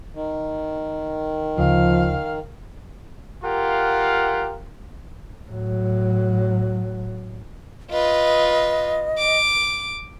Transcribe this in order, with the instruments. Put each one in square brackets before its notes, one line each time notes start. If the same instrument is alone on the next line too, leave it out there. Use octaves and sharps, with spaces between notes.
[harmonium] D#3
[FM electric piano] D2 C#3 [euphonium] F3 [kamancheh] F5
[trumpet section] F4 G4 A#4 F5 F#5
[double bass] A2 F#3
[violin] F4 B4 [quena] D#5
[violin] D6